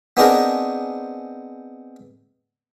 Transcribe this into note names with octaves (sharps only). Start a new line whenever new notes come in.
B3 C4 D4 D#4 G#4 A#4